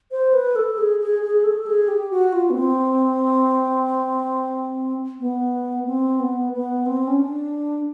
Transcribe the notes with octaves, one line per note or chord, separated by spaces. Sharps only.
C5
B4
A4
G#4
G#4
G#4
A4
G#4
G4
F#4
F4
B3
C4
B3
C4
B3
B3
C4
C#4
D4